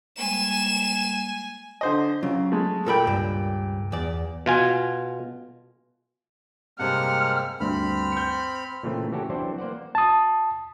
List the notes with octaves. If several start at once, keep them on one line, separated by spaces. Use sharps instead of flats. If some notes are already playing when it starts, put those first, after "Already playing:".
G3 G#3 A#3 G#5 E7
D3 C5 D#5
C#3 F#3
G#3 A3
A#2 A4 A#4 G5 B5
C#2 G2
E2 D5
B2 F4 G#5
G2 C3 G#3 A#3 C4 F#5 F6
D2 G2 C4 B5 F6
G6 C#7
A#2 C#3 E3 A3 C4
E3 C#4 F#4 G4 A4
E3 F#3 C4 D4 C5 D5
A#3 C5 D5 F#5
A5 D#6